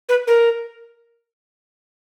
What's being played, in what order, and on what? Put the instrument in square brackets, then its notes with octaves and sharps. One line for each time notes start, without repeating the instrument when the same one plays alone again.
[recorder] B4
A#4